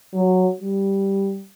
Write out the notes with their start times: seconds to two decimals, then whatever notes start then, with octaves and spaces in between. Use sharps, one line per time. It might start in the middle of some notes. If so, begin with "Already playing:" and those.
0.13 F#3
0.61 G3